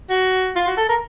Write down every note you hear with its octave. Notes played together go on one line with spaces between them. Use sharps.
F#4
F4
F#4
A4
A#4